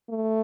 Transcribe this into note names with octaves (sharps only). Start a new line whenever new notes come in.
A3